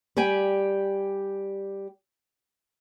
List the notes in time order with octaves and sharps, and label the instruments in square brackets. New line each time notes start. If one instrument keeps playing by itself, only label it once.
[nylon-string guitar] G3 G4 D5 G#5